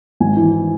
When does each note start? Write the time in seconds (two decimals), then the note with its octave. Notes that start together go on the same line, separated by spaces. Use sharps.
0.20 G#1 G#5
0.37 E3